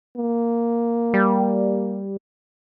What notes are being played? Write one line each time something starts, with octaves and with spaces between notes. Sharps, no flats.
A#3
G3